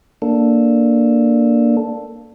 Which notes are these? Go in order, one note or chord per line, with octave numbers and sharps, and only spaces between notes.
A#3 D4 A4